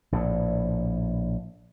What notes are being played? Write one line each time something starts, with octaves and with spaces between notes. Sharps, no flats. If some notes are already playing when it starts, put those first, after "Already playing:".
A#1 A2